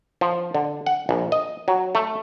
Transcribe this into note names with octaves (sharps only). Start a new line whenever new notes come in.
F3
D3
F#5
A#1
D#5
F#3
A3